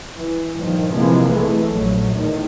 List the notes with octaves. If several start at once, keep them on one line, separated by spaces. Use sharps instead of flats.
E3
G1 G2 A#2 D#3 F3
C3 E3 F3 G#3 A#3 B3
C2 B2 E3 A3
A#1 F#3
E2 A2 D#3